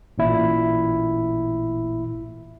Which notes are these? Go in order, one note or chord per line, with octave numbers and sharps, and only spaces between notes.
A1 A#2 E4